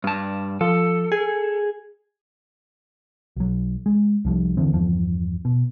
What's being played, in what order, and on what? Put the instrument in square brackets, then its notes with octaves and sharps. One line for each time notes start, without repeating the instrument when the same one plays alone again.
[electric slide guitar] G2 A5
[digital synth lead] F3 [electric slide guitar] A4
[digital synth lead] G#4
[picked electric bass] B1 F#3
G#3
C2 F3 G3
E2 D3 E3 C4
G1 E2 F3
B2